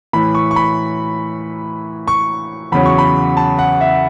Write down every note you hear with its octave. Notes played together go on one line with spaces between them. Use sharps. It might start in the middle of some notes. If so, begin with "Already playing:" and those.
A2 E3 B5
C#6
C#6
B5
C#6
E2 C#3 F#3 B5
C#6
B5
A5
F#5
E5